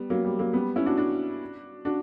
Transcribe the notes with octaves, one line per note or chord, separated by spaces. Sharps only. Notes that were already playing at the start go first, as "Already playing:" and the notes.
Already playing: G3 B3
F#3 A#3
G3
F#3 A#3
G3 B3
C#4 E4
D4 F#4
D4 F#4
D4 F#4